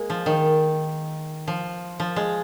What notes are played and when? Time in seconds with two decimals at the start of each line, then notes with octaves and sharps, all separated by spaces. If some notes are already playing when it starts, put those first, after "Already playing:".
Already playing: G#3 A#3
0.10 F3
0.26 D#3
1.48 F3
2.00 F3
2.16 G#3